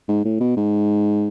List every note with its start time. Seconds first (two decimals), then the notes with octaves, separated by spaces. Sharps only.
0.08 G#2
0.25 A2
0.40 B2
0.56 G#2